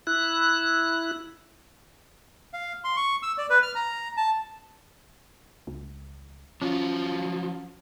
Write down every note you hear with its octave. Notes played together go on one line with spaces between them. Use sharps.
E4 F#6
F5
C6
C#6
E6
D5
B4
F6
A#5
A5
C#2
F3 F#3 C#4 F4